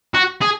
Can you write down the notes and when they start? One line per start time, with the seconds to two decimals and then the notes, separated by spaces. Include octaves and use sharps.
0.14 F#4
0.42 G#4